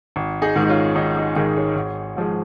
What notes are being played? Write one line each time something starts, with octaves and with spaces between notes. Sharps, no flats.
G#1
D#4 G#4
G#2 D#3 G#3
D#4
C#4 F4
G#1 D#4
D#4
G#2 D#3 G#3 D#4 G#4
G#4 C#5
G#1
G#2 F3 G#3